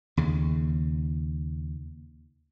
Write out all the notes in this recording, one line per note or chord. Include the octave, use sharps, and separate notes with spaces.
D#2 C#3